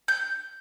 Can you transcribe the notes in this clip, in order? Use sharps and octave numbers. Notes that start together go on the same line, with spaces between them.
G6